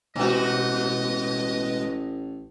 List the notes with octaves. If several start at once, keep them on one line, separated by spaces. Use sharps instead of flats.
A1 B2 G#3 F#4 B4 D#5